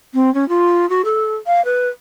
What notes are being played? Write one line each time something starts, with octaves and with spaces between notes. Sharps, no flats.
C4
C#4
F4
F#4
A4
F5
B4